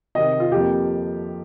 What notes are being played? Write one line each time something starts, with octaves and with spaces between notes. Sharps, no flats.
C3 D#3 C4 D#5
F4
F2 F3 A#3 G4